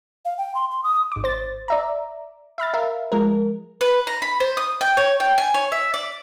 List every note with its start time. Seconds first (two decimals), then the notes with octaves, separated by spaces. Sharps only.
0.25 F5
0.38 G5
0.55 C6
0.71 C6
0.84 D#6
1.12 G#1 D6
1.24 C5 A6
1.68 D5 E5 A#5
2.58 E5 B5 F6 A6
2.74 A#4 E5 F5
3.12 F3 G#3 A#4
3.81 B4
4.07 A#5
4.22 B5
4.40 C5
4.57 D#6
4.81 G5
4.97 C#5
5.20 G5
5.38 G#5
5.54 C#5
5.72 E5
5.94 D5